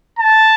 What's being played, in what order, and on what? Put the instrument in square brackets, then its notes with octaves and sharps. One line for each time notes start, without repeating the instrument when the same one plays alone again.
[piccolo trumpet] A5